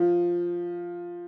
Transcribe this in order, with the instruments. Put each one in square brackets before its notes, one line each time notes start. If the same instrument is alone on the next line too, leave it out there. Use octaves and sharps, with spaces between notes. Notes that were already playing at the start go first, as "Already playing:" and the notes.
Already playing: [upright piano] F3